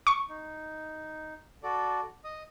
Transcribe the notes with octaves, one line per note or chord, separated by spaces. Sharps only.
C#6
D#4
F#4 A4 D5
D#5 D#6